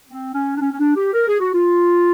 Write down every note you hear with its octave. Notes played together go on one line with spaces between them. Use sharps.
C4
C#4
D4
C#4
C#4
D4
G4
A#4
G#4
F#4
F4